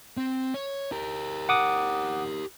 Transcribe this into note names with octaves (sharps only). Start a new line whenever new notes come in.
C4
C#5
G4 A#4
F#5 D6 D#6